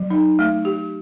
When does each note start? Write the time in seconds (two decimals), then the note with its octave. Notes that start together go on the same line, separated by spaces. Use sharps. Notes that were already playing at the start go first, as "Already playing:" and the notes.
Already playing: F#3
0.10 D#4
0.39 A3
0.65 G4